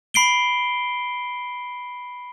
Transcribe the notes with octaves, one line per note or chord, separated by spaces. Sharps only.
B5 C7 D7 G7